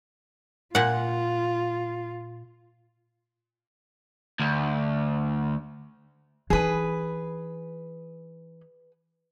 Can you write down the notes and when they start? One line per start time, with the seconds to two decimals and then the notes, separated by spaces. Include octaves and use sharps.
0.75 A#2 F4 F#5
4.40 D2
6.50 E3 D#4 G#4 B4